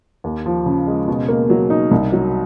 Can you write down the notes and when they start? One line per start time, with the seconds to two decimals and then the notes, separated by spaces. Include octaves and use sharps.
0.24 D#2
0.46 F3
0.66 C#3
0.87 G#3
1.08 B2
1.28 A#3
1.50 F#3
1.70 D#4
1.91 C2
2.12 F#3